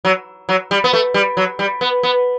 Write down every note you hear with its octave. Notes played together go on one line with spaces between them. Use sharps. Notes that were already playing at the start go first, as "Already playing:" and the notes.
F#3
F#3
G3
B3
A3
G3
F#3
G3
B3
B3